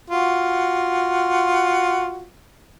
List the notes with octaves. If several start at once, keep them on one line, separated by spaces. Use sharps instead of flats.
F4 F#4